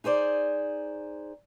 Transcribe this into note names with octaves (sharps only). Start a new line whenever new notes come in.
D#4 G#4 C5 D5